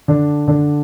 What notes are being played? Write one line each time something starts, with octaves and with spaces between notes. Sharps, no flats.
D3 D4
D3 D4